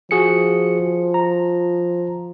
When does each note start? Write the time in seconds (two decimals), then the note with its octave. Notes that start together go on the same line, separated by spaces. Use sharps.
0.11 F3 F#4 G#4 C#7
1.14 A#5